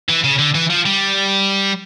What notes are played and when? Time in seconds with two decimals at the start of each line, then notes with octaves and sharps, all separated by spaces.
0.09 E3
0.24 C#3
0.39 D3
0.55 E3
0.70 F3
0.85 G3